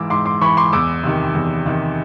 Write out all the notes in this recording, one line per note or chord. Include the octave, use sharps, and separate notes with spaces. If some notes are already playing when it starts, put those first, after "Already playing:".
Already playing: G#2 E3 D6 E6
G#2 C6 D6
C6 D6
E3 B5 C#6
C6 D6
E2 D6 E6
C3 D#3
E2
C3 D#3